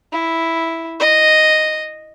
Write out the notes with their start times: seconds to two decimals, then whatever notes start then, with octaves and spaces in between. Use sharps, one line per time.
0.13 E4
1.00 D#5